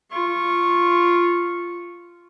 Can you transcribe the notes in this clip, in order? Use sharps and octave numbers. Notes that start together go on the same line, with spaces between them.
F4 C#6